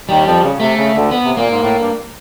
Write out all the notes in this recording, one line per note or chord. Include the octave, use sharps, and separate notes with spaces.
D#2 D#3 G3
F2 F3
C#3
C3 A3
C#3
D2 D3
B3
C3
A#2 A#3
G#2
A2
G2